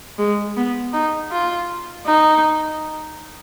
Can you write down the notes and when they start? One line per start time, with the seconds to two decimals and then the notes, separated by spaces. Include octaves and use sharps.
0.18 G#3
0.57 B3
0.93 D#4
1.32 F4
2.07 D#4